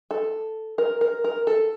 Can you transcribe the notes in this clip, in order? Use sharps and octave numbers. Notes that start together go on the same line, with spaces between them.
A4
A#4
A#4
A#4
A4